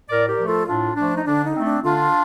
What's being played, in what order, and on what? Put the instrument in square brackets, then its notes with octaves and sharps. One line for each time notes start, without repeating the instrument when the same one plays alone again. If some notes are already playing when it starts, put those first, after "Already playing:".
[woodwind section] A2 A#4 D5
G4 A#4
F3 A3
F4 A4
A2 D4 F4
F3 A3 D4
D#4
D3 D4
D#4
A3 C4
D4
D3 D4 F4